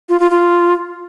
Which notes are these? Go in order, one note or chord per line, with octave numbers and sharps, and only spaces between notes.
F4
F4
F4